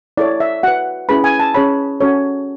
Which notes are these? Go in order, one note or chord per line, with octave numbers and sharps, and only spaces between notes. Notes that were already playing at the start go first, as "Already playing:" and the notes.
E4 A4 C#5 D5
E5
F#4 B4 F#5
C#4 E4 G#4 B4 B5
G#5
A5
C#4 G#4 C#5 B5
C#4 F#4 A4 C#5